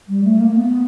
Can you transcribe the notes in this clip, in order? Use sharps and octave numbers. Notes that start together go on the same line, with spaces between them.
G3
A3
A#3
B3